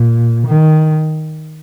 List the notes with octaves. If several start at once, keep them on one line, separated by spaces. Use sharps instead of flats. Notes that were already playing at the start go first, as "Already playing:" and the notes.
Already playing: A#2
D#3